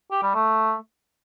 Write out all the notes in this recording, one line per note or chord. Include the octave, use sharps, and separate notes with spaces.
G4
G3
A3